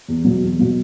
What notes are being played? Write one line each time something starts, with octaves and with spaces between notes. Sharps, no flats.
E2
B2 F#3
E2
B2 F#3